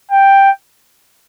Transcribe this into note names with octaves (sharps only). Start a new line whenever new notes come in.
G5